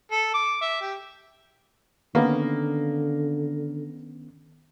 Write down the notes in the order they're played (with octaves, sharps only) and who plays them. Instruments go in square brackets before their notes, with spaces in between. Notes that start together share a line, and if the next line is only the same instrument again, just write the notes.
[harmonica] A4
D6
E5
G4
[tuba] D3 [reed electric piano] D#3 B3 C#4 [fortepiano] A#3